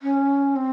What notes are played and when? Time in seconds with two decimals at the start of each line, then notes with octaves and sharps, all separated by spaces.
0.02 C#4
0.56 C4